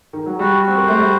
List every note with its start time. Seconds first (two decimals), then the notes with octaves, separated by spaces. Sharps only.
0.13 D#3
0.26 F#3
0.39 G3 F#4
0.62 F#4
0.68 C4
0.78 A#3
0.86 A3 C5
0.98 G3